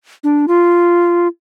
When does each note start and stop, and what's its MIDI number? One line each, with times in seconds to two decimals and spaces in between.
0.24 0.46 62
0.48 1.28 65